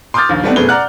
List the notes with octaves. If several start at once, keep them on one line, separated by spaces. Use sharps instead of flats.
C6 D6 D#6 F6 G6 A6
A#1 D#2
G3 A3 B3 C4 D4 D#4
F#1 B2 A3 G#4 B4 G7
D5 F#5 A#5 F6 F#6